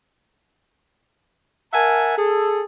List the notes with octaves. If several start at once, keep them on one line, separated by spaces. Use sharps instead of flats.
A#4 E5 F#5 G#5 A5
G#4 A4